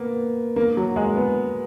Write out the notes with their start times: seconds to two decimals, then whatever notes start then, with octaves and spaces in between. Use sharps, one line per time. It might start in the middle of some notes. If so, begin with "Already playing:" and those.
Already playing: A#3 B3
0.56 A#3
0.77 F#3
0.96 G#3
1.16 B3